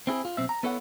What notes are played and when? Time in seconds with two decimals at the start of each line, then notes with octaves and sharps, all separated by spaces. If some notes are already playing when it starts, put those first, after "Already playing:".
0.07 C4 E4 G#4
0.25 F4
0.37 B1 C4 E5
0.49 A#5
0.63 B3 E4 A4 C#5 E5 F#5